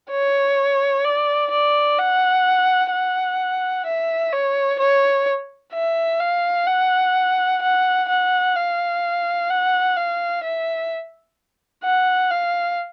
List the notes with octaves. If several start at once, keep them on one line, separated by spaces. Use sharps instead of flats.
C#5
D5
D5
F#5
F#5
E5
C#5
C#5
E5
F5
F#5
F#5
F#5
F5
F#5
F5
E5
F#5
F5